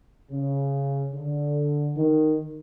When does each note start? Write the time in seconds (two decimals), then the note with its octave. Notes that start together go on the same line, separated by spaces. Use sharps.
0.31 C#3
1.13 D3
1.95 D#3